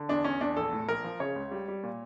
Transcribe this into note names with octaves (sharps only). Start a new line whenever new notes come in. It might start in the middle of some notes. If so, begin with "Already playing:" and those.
Already playing: D3
E2 D4
E2 C#4
E2 D4
A#1 A4
A2
A#1 A#4
F3
C#3 C#5
C#2
G3
G3
A#2